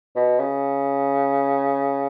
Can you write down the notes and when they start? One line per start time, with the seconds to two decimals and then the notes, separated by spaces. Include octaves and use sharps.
0.16 B2
0.39 C#3